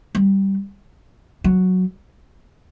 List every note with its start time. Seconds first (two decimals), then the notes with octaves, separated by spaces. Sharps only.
0.15 G3
1.44 F#3